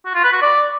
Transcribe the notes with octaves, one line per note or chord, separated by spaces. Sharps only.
F#4
F4
B4
F#4
D5